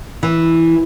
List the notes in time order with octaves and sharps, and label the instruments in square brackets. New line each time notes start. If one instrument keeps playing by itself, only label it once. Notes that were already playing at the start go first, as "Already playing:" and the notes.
[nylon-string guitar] E3